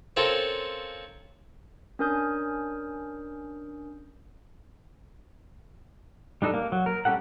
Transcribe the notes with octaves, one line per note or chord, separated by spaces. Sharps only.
C4 C#4 F4 A4 A#4
C#4 D4 A#4 G#5 D#6 G6
G3 D4 D#4 A4
A#3
F#3
A#4
G3 C#4 G4 A4 F#5